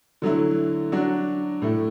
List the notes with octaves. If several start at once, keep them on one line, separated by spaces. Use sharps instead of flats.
D3 F#3 A3 E4
F#3 D4 F#4
A2 A3 E4